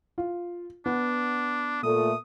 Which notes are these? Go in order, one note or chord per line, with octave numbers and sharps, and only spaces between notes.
F4
B3 D4
A#2 A3 D#6